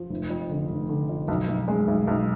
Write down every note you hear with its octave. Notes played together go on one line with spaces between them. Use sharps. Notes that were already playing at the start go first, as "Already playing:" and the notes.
Already playing: F3
F1
F2
D3
F1
D3
F2
B1
B1
G#3
B1
B1